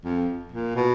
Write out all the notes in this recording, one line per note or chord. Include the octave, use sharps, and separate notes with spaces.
F2
A#2
B2